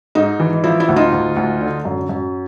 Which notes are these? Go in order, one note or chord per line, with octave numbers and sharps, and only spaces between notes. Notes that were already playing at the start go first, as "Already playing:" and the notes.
G#2 D#4
E3
F3 E4
E4
D2
D#4 F4
D2
D2
D3
F#2
F#2